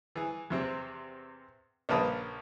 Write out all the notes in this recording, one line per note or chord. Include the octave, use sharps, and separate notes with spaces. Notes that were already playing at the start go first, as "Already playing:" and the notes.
E3 G#4
E2 C3 C4
A#1 C#3 A#3 B4 A5 D#6